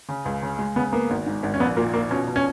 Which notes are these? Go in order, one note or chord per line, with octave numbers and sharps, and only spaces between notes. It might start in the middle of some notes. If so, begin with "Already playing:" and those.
C#3
C#2
C#3
G#3
C#3 B3
A#3 B3
G#1
G#2
G#1
C#4
A#1 B3
A#2 A#3
F3 A#3
B2 C#4
B2
C#4